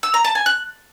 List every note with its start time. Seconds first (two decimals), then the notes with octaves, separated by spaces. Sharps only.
0.03 E6
0.14 A#5
0.25 A5
0.35 G#5
0.46 F#6